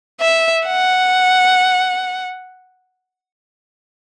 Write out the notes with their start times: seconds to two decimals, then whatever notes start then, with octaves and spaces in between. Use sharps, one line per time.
0.20 E5
0.65 F#5